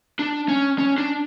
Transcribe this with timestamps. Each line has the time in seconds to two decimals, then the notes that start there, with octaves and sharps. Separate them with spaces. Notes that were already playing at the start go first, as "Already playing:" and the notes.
0.19 D4
0.48 C#4
0.79 C#4
0.98 D4